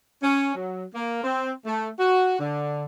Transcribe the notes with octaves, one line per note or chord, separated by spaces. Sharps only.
C#4
F#3
A#3
C4
A3
F#4
D3